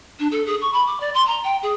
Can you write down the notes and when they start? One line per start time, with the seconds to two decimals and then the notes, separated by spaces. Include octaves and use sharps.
0.19 D4
0.31 A4
0.46 G#4
0.61 C#6
0.73 B5
0.87 D6
1.00 D5
1.14 C6
1.27 A#5
1.43 G5
1.62 G#4